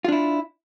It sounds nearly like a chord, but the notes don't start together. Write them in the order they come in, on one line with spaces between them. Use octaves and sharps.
F4 D4 E4